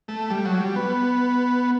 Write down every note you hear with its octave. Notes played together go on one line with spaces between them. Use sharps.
A3
G3
F#3
G3
B3